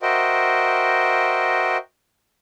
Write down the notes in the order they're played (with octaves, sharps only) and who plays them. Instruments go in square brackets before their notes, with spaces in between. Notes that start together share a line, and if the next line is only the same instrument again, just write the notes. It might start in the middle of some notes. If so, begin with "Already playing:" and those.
[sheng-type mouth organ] F#4 A#4 C5 D#5 E5 G5